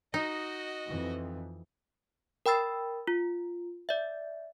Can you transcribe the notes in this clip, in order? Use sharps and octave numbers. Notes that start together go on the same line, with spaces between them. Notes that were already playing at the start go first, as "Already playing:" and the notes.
D#4 F#4 D#5
F2 E3
A#4 G5 B5 E6 A6
F4
D5 E5